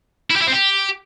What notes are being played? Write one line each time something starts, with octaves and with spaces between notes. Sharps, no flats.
E4
G4
E4
C4
G4